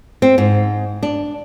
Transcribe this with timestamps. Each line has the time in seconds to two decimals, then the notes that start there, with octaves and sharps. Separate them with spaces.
0.22 C4
0.38 G#2
1.03 D4